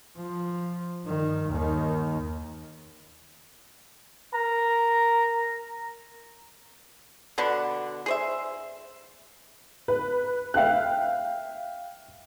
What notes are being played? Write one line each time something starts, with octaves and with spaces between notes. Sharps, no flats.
F3
G2 D#3
D#2 D#3
A#4 A#5
B2 D3 B3 D4
G#4 C5 E5
B4
E5 F5 G5 F#6